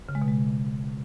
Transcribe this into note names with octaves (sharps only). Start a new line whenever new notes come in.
C#3
G#3
B2
G#3